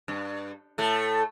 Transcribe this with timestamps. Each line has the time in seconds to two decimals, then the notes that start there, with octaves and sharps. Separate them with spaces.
0.08 G2
0.78 A2 A3